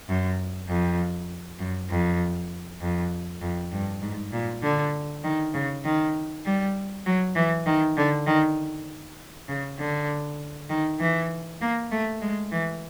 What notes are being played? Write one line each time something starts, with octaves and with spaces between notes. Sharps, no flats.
F#2
F2
F#2
F2
F2
F2
G2
G#2
A#2
D3
D#3
C#3
D#3
G3
F#3
E3
D#3
D3
D#3
C#3
D3
D#3
E3
A#3
A3
G#3
E3